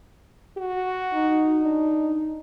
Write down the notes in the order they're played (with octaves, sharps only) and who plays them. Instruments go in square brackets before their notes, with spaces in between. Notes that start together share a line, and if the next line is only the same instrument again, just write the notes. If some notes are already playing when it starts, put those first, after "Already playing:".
[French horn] F#4
[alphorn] D#4
[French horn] D4